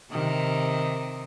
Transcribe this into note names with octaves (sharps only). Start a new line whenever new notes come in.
C3 D#3